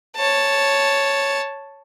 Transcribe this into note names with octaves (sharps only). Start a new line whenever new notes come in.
C#5 A5